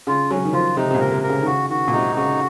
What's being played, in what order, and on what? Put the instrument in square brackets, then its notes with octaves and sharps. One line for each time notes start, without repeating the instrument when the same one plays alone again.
[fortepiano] C#3 [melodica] F4
[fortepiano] F#3 [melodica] C#4
[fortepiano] D#3
[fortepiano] F3 [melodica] F4
[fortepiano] C3 [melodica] D#4
[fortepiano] C3
A#2
[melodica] A#4
[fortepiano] C3
[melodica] A#4
[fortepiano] C#3
D#3
[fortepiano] C#3 [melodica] F#4
[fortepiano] D#3 [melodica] F#4
[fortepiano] A#2
[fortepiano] C3 [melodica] D#4
[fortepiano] C#3 [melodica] F#4